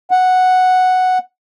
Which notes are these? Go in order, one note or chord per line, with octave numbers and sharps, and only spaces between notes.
F#5